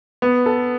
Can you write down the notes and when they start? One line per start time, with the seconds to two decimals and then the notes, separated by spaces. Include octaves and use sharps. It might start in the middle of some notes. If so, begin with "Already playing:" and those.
0.22 B3
0.46 A4